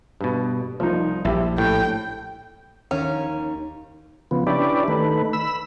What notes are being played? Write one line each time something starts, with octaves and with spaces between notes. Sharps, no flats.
G2 B2
C2 F3 D#4
A#1 E4 G4
A2 G5
D#2 C#4
C#3 F3 B3
C#4 D4 E4 G4 B4 D5
D#3 A3 B4
B5 E6